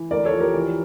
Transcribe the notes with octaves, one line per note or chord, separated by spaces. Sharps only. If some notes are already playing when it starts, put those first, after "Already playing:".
Already playing: E3
D2 A#4 D5
A4 C#5
F3
G4 A#4
E3